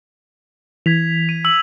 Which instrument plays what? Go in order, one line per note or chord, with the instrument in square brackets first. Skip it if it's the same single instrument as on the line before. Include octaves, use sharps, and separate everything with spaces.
[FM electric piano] E3 [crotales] G#6 B6 F7
[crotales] D#7
E6 F#7